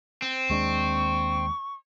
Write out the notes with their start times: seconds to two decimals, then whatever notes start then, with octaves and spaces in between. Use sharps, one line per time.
0.22 C4
0.50 D#2 G#3 D4 C#6